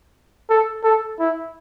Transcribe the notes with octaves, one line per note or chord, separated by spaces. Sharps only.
A4
A4
E4